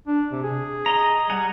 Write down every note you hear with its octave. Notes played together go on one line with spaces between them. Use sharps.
D4
C3
G#4
D#5 A#5
G3 F#5 G#5 A#5